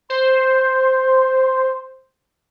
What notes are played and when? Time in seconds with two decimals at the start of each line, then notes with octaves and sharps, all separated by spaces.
0.10 C5 C6